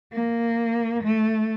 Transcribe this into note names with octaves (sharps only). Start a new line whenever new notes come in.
A#3
A3